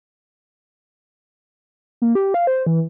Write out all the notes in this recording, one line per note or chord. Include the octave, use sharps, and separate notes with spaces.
A#3
G4
F5
C5
E3